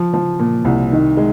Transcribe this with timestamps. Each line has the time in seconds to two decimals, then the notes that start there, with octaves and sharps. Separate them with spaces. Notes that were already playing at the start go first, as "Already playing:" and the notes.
Already playing: F3
0.13 F3
0.40 A#2
0.65 C2
0.92 D#3
1.17 G#3